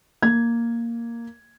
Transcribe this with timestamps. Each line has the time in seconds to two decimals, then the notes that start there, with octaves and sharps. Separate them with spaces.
0.22 A#3 G#6